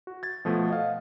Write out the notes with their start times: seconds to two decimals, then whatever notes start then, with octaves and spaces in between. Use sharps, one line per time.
0.07 F#4
0.23 G#6 A6
0.45 B2 F3 A3 B3
0.70 D#5 F5